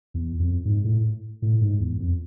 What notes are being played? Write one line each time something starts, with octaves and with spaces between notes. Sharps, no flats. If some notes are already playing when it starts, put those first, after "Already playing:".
E2
F2
G#2
A2
A2
G#2
E2
F2